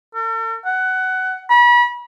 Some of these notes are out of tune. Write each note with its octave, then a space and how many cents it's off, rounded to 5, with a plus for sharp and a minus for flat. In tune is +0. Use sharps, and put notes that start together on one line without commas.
A4 +45
F#5 +15
B5 -35